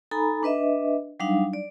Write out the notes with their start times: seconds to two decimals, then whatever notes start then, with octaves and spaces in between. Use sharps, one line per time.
0.11 D#4 A4 G#5 A#5 B5
0.43 D4 B4 D#5 E5
1.20 F#3 G3 D4 D#4 F5
1.53 D5